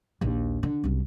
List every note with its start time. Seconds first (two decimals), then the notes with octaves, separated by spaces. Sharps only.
0.21 A#1 D#2
0.63 D3
0.84 C2 F#2